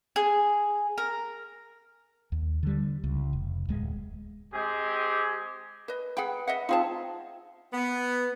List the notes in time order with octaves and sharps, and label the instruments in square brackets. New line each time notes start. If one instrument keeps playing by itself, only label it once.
[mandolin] G#4
A#4
[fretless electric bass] D#2
D3 G3
C#2
F1
D1 G#3
[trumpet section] G#3 C4 G4 G#4
[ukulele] B4 D#5
[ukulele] G#4 F#5 G5 [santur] B4
[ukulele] D#5 E5 F#5
[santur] C4 F4 [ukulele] D#4 G#4 A5
[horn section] B3